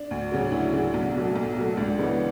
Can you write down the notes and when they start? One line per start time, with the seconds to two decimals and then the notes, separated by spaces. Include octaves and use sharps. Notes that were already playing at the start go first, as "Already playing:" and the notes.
Already playing: D4
0.11 D2
0.32 C#3 F#3
0.42 D4
0.52 D2 E4
0.72 C#3 F#3 D4
0.94 B1
1.15 B2 F#3 A3
1.36 B1
1.57 B2 F#3 A3
1.77 C#2 D4
1.98 C#3 E3 G#3 B3